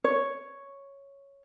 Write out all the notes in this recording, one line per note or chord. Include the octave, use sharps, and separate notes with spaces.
C#5